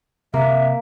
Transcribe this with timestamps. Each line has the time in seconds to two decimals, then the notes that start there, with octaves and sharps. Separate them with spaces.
0.34 C3 A#3 E5